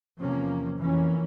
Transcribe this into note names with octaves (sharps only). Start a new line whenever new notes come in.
E2 C3 F3 A#3 C#4
F2 E3 A#3 C#4